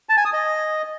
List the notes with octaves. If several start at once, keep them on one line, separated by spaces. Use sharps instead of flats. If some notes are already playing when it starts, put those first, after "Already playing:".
A5
G#5
D#6
D#5